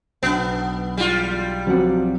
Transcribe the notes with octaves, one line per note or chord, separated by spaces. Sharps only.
B1 B3 D4
E2 G3 F4
F3 F#3 C4 F#4 D5 F#5